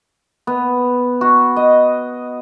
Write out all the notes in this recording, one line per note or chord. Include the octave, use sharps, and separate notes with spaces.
B3
F#4
D#5